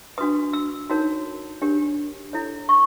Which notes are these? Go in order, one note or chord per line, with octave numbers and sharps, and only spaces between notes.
D4 F#4 B4 D#6
E6
D#4 F#4 A#4 C#5
D4 G4 A#4 C#5
E4 A4 C#5
C#6